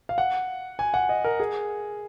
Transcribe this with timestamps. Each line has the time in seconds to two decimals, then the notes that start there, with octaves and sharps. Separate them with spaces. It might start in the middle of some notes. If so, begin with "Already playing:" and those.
0.09 F5
0.18 F#5
0.79 G#5
0.94 F#5
1.09 D#5
1.24 A#4
1.40 G#4